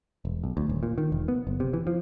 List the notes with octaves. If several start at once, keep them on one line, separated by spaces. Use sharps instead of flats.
E1
B1
D2
D#1
A#2
D#3
E1
B3
F#1
C3
E3
F3